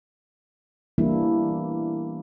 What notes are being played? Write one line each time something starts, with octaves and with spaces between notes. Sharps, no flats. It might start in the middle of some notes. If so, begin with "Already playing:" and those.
E3 G3 A#3 B3 D4 E4